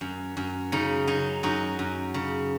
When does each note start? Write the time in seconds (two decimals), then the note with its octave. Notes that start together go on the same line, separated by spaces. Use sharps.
0.01 F#2
0.37 F#2
0.72 C#3 D#4
1.07 F#3 D#4
1.43 F#2 D#4 F#4
1.79 F#2
2.14 C#3